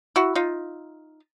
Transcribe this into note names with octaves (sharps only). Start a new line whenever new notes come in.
E4 F#4
D#4 F4